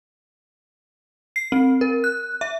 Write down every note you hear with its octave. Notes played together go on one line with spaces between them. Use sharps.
C7
C4
A#4
F#6
E5